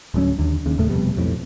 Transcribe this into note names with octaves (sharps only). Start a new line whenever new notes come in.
D1 D2 F#3 C#4
D#2 D3
D#2 C#3
F#1 D#2 A2 A3
F1 F2 B2 G3
B1 F2 A2